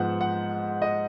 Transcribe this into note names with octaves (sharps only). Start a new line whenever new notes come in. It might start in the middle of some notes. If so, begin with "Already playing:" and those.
Already playing: G#2 F3 B3 F#5
F#5
D#5